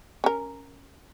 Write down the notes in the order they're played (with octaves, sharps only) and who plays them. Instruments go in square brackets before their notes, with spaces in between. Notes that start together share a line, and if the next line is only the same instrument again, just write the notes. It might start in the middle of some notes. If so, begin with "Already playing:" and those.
[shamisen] C#4 A#4